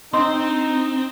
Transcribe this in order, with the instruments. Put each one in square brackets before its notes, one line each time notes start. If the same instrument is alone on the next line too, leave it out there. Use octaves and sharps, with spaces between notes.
[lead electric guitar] C4 [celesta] D4 D#5 [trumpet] D#4 [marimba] C6